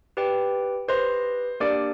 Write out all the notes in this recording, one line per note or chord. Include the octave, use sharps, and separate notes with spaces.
G4 B4 D5 G5
G4 B4 C5 D#5
A#3 D4 G4 A#4 D5